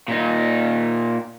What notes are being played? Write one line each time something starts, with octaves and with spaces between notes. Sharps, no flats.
A#2 D#4